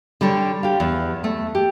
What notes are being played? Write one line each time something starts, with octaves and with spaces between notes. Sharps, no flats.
D3 G3 D4 C#5
G4 F5
E2
A3
G4